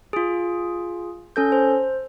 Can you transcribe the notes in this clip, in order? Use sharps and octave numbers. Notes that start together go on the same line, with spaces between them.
F4 G#4
C#4 A4 G6
C5